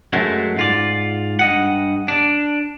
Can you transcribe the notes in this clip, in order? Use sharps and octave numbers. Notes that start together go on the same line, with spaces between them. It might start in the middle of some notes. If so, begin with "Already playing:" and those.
F#2 F#3 G#3 A3
G#2 F4 D5
G2 D#5 F#5
D4